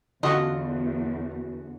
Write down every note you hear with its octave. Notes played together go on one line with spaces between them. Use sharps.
E2 D3 C#4 F4 F#4 D#5